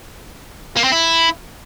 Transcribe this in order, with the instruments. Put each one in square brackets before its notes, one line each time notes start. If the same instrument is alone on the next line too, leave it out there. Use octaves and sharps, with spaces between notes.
[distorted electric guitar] A#3
C4
E4